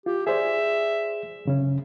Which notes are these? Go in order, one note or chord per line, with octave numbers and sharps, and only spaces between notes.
F4 G4
G#4 C5 D5 E5
F#2 C#3 C#4